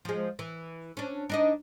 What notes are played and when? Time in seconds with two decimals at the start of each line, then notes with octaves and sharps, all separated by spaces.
0.05 F3 G#3
0.39 E3
0.97 C#4 D4
1.29 D4 D#4 D#5